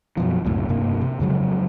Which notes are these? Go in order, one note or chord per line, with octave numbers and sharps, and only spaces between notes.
F#2 B2 F3
C#2 F#2 A2 C3
F1 G2 C3 A#3
C3
F2 C#3 F#3 G#3